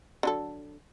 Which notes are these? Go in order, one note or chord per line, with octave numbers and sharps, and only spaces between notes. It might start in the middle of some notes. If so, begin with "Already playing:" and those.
D3 F#3 A4